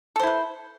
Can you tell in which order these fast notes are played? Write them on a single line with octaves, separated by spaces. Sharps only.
A4 C5 E4 B4